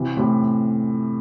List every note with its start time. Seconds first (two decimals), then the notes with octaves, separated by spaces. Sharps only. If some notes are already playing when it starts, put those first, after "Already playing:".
Already playing: C3 E3
0.17 A2 C3